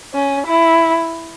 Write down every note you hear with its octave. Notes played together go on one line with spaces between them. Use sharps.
C#4
E4